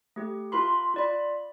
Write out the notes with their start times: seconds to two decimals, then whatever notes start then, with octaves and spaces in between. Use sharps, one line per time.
0.16 A3 G4
0.52 F4 A#4 B5 C6
0.94 F4 D5 B5